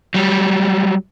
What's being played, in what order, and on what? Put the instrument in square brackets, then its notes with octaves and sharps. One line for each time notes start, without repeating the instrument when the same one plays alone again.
[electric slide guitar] F#3 G3